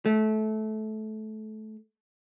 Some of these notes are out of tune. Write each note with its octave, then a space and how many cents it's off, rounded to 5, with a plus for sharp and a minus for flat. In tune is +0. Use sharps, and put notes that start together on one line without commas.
A3 -20